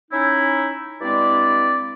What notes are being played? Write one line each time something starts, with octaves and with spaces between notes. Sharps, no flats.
C#4 D#4 E4
G2 G#3 C4 E4 D5